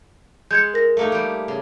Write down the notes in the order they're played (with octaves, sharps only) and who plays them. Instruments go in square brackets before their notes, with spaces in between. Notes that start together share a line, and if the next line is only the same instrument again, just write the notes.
[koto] G#3 [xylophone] G6 G#6 C#7
[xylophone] A#4 A#6
[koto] A3 A#3 D#4
G3 G4
C#3